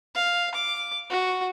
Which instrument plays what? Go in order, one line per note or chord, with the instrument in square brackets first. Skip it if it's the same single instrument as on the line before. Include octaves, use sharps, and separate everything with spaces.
[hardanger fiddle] F5
D6
F#4